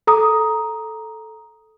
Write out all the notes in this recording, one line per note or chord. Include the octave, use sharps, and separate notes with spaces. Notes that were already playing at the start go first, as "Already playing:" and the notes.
A4 A#5 D#6